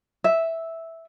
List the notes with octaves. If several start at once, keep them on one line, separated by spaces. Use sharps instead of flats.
E5